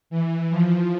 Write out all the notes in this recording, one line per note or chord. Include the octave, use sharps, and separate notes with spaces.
E3
F3